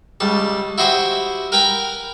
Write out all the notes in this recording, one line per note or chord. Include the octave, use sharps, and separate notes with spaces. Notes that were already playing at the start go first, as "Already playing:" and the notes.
C#2 G3 A5
E4 F#4 G4 C5 D#5 E5
A#4 B4 G5 G#5 A#5 B5